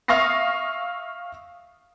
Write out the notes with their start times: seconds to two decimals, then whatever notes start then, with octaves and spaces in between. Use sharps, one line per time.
0.08 E5 F5 C#6 D#6 A#6 C7